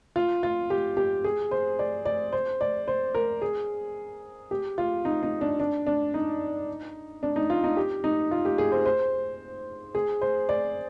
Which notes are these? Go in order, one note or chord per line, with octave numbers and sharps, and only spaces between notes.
F4
F4
G4
G4
G#4
C5
D5
D5
C5
D5
C5
A#4
G#4
G4
F4
D#4
D#4
D4
D4
D4
D#4
D4
D#4
F4
D#4
G4
D#4
F4
G4
G#4
C5
C5
G#4
C5
D5